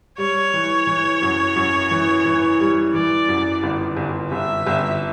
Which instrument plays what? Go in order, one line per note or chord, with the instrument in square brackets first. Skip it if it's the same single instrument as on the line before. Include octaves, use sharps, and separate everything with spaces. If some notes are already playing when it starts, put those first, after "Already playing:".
[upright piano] G3 [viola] C#5
[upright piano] E3
E3
F#2
F#2
E3
E3
G3
[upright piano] E3 [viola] D5
[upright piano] F#2
G1
G1
[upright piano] G1 [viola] E5
[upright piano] G1